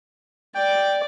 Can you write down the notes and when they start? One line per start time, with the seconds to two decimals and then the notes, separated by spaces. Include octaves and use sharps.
0.55 D5 G5